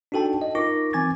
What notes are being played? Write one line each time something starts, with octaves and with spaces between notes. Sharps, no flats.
D4 D#4 F#4 A4 G5 A5
D#5
D#4 F4 A#4 C#6 D6 A#6
E3 C4 G#5 D6 G#6 A6